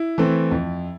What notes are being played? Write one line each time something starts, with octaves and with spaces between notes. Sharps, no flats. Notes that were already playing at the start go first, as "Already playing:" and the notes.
Already playing: E4
E3 A3 C4
F2